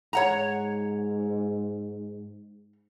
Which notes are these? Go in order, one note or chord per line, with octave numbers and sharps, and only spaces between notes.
G#2 C#5 F#5 A#5